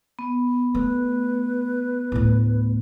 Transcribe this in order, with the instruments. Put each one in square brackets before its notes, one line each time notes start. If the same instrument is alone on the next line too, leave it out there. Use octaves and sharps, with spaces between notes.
[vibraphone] B3
[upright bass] A3 [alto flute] B4
[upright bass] D2 A2